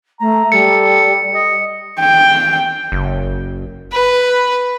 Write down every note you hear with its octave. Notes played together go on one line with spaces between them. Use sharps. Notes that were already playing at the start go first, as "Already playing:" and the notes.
A3 A#5
G3 A4 C#7
D#5
G5
F#1
B4